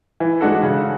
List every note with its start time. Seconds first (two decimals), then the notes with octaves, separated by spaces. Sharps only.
0.20 E3
0.41 G#3 D4 F#4 A4
0.63 C#3